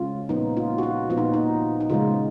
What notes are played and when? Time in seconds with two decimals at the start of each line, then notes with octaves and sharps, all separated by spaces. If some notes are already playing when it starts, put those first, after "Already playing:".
Already playing: C#3 G#3 C#4 F4
0.29 A#2 F3 B3 D#4
0.57 F4
0.78 F#4
0.83 F4
1.10 A#2 F3 B3 F4
1.17 D#4
1.34 D#4
1.81 D#4
1.90 C#3 F3 G#3 F4